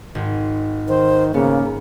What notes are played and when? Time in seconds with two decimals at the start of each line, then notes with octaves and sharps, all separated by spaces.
0.15 G#1
0.89 D#3 C5
1.34 C#3 A#3 B3